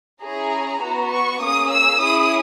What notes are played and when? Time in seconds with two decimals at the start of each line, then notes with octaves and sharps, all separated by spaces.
0.23 C#4 E4 G#4 A#5
0.82 B3 F#4
1.12 C#6
1.41 A#3 C#4 G#4 D#6
1.70 E6
1.99 C#4 E4 G#4 D#6